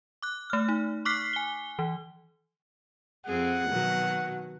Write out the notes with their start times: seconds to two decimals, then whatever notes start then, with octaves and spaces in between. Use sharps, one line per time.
0.22 D6 F#6
0.50 A3 F6
0.69 D#4
1.05 C#6 D6 F6 F#6 B6 C7
1.33 G#5 G7
1.79 E3
3.26 F2 C4 G#4 F#5
3.69 B2 D#3 F#3